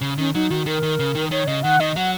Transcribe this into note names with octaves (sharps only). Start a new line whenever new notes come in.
C#3
D#3 C#4
F#3 D#4
D#3 F#4
D#3 A#4
D#3
C#3
D#3
D#3 C#5
C#3 D#5
D#3 F#5
D#3 D#5
F#3 F#5